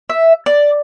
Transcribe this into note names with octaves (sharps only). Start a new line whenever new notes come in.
E5
D5